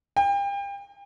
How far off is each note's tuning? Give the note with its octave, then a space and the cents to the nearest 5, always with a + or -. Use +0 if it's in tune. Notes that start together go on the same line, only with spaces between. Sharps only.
G5 +35